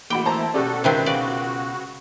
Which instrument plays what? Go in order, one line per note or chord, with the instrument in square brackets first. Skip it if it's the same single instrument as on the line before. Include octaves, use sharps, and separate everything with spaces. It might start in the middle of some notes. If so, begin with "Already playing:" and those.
[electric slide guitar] E3 A3 A#3 [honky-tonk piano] F#4 B5 D6 [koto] G5
[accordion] E4 [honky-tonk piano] C5 A5 A#5
[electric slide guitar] B2 C#4 [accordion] F#4 A4 [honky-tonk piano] G4 D5
[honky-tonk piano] C#2 G5 [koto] C3 D#3 C4 [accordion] B4 C5
[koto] C#3 B4 D5 [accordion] F#4